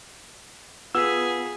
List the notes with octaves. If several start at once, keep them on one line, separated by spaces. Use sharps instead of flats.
B3 F4 G#4 E6 B6